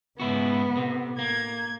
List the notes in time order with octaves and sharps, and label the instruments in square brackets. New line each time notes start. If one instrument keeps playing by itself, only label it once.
[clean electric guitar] G#2 E4 F#4 [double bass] C#3 [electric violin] B3
[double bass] A2 [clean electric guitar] C3
[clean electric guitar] A#3 [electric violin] G#6